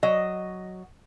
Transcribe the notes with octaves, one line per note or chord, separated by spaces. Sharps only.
F#3 D#5